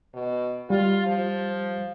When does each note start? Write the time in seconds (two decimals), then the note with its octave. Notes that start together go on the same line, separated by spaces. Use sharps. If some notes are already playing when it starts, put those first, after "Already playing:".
0.14 B2
0.70 G3 F4
1.06 F3